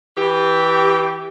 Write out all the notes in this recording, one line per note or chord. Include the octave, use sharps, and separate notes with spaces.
E3 G4